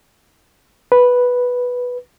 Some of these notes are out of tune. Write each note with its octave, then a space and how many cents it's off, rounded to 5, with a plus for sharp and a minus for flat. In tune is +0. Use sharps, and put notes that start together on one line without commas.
B4 -5